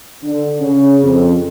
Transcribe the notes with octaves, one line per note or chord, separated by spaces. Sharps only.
D3
C#3
F2